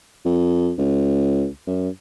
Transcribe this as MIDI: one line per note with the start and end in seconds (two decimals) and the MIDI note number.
0.25 0.73 41
0.78 1.47 37
1.67 1.89 42